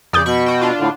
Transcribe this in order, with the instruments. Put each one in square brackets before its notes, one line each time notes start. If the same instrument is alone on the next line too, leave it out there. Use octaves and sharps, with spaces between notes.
[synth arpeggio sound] F2 D#6 G6 [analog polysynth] C#3 D5
[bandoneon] B2 [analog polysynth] B5 C#6
[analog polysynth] F#4 G5
D4 F4
[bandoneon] A2 D3